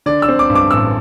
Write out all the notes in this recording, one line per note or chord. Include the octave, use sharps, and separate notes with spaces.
D3 D5
E6
C4
D6
G2
D6
A1 E6